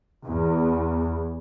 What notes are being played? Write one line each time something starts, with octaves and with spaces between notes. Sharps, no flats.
E2